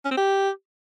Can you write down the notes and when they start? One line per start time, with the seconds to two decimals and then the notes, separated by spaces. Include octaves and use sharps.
0.05 C#4
0.11 C4
0.17 G4